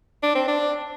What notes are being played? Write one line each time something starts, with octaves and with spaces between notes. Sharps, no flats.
D4
C4
D4